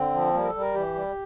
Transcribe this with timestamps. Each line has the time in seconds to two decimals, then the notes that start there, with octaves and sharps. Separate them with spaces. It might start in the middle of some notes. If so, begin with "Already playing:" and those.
Already playing: D3 C4
0.14 F3
0.34 G3 A#3
0.43 A#4
0.48 A4
0.55 G3
0.61 A#4
0.75 E3 G4
0.95 G3